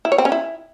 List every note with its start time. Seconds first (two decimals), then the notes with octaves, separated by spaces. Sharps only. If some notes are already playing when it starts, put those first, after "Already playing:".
0.05 E4
0.12 C#5
0.18 C4
0.25 C#4
0.32 E4